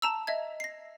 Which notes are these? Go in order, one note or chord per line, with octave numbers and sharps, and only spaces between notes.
A5 A#5 E6
D#5 E5 G#6
A#6 C7